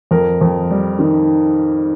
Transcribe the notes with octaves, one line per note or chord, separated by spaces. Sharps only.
F2 A#4
F2
G3
D#3